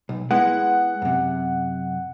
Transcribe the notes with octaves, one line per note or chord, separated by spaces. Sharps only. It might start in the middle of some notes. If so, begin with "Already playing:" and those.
B1
G#3 B3 E4 F#5
F#2 C3